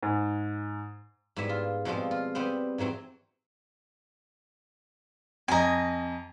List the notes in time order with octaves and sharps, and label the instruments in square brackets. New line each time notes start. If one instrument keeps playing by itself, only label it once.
[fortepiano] G#2
[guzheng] G#2 G3 B3 E4 E5
F4
B2 F3 G3 G#3 C4
F4
G3 B3 C4 C5
G#2 E3 F#3 C4
[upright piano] F2 D#5 [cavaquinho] G#5 A#5